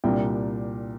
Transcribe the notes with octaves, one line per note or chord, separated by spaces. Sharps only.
C2 A#2 G3 A#3 D4 G5